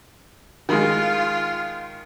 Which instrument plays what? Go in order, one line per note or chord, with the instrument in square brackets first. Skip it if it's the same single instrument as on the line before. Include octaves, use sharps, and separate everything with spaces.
[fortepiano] D#3 G#3 [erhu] F4